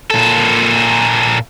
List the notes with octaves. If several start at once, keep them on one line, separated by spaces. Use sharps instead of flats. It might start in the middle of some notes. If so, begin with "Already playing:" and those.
A#2 A4